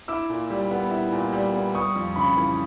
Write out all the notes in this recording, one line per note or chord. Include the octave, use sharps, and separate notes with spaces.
E4 D6 E6
A#2
G3
B3
E4
A#2
G3
B3
G3 C#6 D#6
F2
C#3 B5 C#6
E3